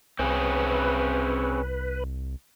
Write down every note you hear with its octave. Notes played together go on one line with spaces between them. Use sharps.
C2 C4 C#4 G#4 B4